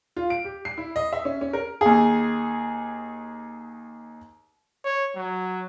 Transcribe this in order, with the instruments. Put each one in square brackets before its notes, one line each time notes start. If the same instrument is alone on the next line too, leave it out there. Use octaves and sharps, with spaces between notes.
[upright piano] F4
D7
G4
C7
E4
D#5
E5
C#4
C#4
A#4
[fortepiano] D#2 G#4
[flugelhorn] C#5
F#3